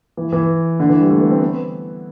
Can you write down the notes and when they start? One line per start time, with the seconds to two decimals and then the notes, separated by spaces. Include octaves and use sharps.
0.17 E3
0.33 E3
0.80 D3
0.89 E3
1.01 G3
1.11 A3
1.21 B3
1.31 C4
1.42 B3